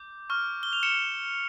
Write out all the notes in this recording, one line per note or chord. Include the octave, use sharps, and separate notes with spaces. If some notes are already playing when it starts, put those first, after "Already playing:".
Already playing: D6 G6
C#6 F6
G7
F7
C#7 E7